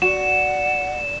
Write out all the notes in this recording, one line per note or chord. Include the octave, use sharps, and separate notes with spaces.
F#4 D5 F#5 E7